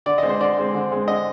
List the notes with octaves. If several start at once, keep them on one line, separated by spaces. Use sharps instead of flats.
D3 D5
G#3 C4 D#5
C5
D3 D5
G#3 C4
D3
G#3 C4
D3 D#5